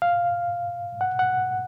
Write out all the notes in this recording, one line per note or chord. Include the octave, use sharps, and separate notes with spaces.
F5
F#5
F#5